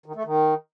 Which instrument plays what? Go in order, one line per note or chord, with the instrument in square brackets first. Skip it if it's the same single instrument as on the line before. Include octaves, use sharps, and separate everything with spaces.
[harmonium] D#3
A3
D#3